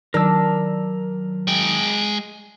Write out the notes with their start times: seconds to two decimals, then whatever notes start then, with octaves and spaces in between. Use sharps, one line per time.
0.14 D#3 F#3 D4 A#4 E6
1.47 G#3 G5